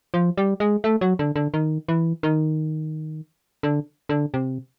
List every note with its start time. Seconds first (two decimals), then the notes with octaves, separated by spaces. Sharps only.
0.14 F3
0.38 G3
0.60 G#3
0.84 A3
1.01 F#3
1.19 D3
1.36 D3
1.54 D#3
1.89 E3
2.23 D#3
3.63 D3
4.09 D3
4.34 C3